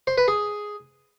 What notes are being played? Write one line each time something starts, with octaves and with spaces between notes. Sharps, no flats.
C5
B4
G#4